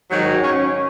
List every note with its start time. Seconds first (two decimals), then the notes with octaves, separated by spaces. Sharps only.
0.11 G#2 D#3 F#3
0.43 C#4